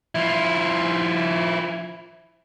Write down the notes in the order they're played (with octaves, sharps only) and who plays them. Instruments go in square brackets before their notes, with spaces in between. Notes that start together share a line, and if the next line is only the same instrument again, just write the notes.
[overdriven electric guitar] F3 E4